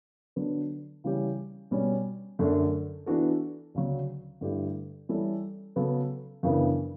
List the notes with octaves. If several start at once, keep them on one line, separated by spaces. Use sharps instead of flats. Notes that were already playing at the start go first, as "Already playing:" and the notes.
D3 F#3 B3 D4
C#3 E3 G3 C#4 G4
B2 G3 C#4
F#2 D3 A3 D4
E3 B3 D4 F#4 A4
D2 C#3 F#3
G2 D3 A3 E4 G4
E3 G3 C#4 E4 A4
C#3 F#3 B3 F#4 A4
F#2 C#3 E3 B3 D4